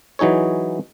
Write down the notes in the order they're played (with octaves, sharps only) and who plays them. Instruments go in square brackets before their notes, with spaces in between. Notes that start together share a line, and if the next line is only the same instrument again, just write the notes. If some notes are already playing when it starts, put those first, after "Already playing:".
[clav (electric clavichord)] E3 F#3 D#4 G#4 C#5